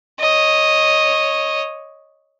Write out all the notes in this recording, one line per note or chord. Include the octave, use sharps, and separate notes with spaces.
C#5 D#5